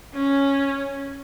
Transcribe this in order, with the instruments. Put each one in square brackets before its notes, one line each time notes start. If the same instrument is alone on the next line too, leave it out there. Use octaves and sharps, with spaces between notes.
[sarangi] C#4